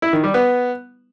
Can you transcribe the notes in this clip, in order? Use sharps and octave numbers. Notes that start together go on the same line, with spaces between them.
E4
D#3
G3
B3